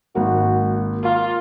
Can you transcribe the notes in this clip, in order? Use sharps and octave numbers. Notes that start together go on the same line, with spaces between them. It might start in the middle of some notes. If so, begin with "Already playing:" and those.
G#1 A#3 F#4
A#3 F4